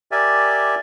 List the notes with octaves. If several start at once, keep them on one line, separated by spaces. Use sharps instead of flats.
G4 A#4 D5 E5 G#5